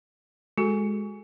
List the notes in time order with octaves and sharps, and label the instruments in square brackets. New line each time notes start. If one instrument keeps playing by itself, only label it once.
[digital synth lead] G#3 [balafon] F#4 A4